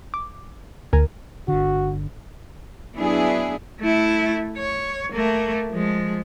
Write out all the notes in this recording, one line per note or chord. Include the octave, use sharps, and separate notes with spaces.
D6
D2 A#4 G#5
G1 D3 F#4
F#3 B3 D4 E4 G#4
A3 E4
C#5
A3 A#3
F3 G#3